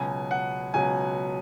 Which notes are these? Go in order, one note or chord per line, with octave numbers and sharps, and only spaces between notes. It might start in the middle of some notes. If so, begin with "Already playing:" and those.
Already playing: C#2 B2 F#3 G#5
F#5
C#2 B2 F#3 G#5